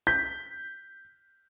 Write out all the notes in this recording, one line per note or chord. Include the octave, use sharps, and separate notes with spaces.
G6 B6